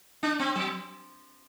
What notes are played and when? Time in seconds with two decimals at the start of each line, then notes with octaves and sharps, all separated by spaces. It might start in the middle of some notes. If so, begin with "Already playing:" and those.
0.23 D4
0.39 C4
0.55 F#3